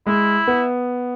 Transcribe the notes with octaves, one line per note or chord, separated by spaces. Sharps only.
G#3 E4
B3